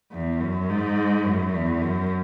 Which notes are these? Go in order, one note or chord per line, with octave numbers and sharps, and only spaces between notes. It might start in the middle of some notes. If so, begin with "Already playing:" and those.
E2
F#2
G#2
F#2
E2
F#2